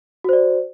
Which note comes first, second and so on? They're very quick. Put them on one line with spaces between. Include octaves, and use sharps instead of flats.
F#4 C5 D5